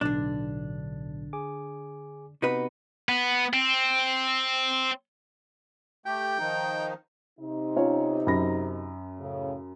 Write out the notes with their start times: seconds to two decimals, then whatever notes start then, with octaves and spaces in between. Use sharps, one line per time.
0.01 B1 A2 D3 D4
1.33 G#4 G#5 D6
2.42 C3 B3 D#4 F#4 B4 C#7
3.09 B3
3.53 C4
6.06 A3 G4 G5
6.39 D#3 F3 D#4
7.40 C3 D#4
7.76 C#4 F4 C#5
8.27 F#2 B5 A#6
9.19 A2 C#3